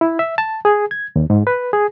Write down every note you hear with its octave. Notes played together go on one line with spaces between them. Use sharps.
E4
E5
A5
G#4
G#6
D#2
G#2
B4
G#4